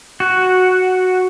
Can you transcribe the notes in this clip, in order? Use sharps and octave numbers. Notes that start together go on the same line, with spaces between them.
F#4